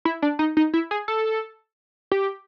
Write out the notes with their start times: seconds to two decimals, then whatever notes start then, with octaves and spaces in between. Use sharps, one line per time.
0.05 E4
0.22 D4
0.39 D#4
0.57 D#4
0.73 E4
0.91 G#4
1.08 A4
2.11 G4